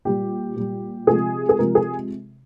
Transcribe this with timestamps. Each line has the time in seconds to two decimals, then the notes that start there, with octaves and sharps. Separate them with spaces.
0.05 A#2 G3 G4
0.56 A#2 G3
1.07 C3 F3 G#3 G#4
1.49 G#4
1.59 C3 F3 G#3 A#4
1.75 G#4